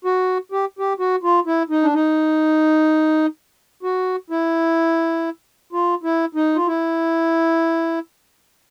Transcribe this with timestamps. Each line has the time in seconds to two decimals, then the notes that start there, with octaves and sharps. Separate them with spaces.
0.05 F#4
0.52 G4
0.79 G4
0.99 F#4
1.23 F4
1.46 E4
1.70 D#4
1.83 D4
1.94 D#4
3.83 F#4
4.30 E4
5.73 F4
6.03 E4
6.35 D#4
6.56 F4
6.67 E4